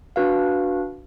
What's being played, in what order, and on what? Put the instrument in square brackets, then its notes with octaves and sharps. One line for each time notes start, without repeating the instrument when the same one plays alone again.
[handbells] D4 F#4 B4 F5